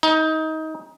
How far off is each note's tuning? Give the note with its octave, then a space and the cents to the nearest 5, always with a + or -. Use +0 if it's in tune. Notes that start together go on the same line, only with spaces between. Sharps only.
D#4 +25